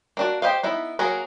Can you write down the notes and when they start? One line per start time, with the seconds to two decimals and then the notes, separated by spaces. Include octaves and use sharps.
0.17 A#3 D4 F#4
0.42 G4 C5 D#5 F5
0.63 B3 D#4 E4
0.99 F#3 A#3 F#4 G#4 A#4